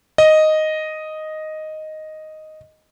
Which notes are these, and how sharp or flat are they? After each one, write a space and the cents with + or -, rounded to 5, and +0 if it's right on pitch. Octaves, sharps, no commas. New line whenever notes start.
D#5 +0